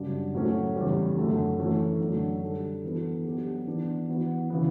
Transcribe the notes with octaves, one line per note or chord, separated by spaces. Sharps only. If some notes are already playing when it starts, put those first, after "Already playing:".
Already playing: F#2 C#3 G3 D4 F#4
A2 F#3 A3 C#4
E2 C#3 G3 C#4
F#2 D3 F#3 A3
E3 A3 C#4
F#2 D3 F#3 A3 D4
D3 G3 D4 A4
E3 B3 F#4 A4
F#3 B3 D4 G4
E3 B3 D4
E3 B3 F#4
C#3 E3 B3